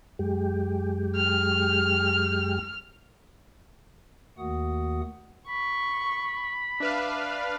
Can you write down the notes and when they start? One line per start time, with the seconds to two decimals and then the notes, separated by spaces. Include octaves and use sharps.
0.19 F#2 G#3 G4
1.16 F6
4.38 D#2 D#3 A3 F#4 F#5 D#6
5.49 B5 C#6
6.80 D4 B4 E5 F5